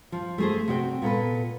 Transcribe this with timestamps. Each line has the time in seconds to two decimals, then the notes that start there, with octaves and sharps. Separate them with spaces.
0.12 F3
0.38 A3 G#4 C5
0.68 C3 F#4 D5 G5
1.02 A#2 B3 A4 B4